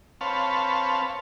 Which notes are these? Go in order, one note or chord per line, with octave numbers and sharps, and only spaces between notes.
C4 B4 C#5 F5 A5